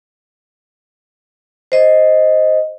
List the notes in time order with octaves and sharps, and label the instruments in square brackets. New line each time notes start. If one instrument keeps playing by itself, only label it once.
[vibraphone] C5 D#5